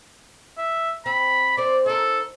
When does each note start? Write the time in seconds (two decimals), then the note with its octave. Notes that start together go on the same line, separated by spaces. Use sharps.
0.58 E5
1.06 C4 B5
1.57 C4 C5 D5
1.86 D#4 A4 A#4